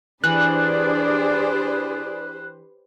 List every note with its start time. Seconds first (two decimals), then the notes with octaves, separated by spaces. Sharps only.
0.24 E3 D4 G4 G#4 B4 C5 D5 F#6